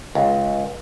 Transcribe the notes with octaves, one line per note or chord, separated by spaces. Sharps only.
C#2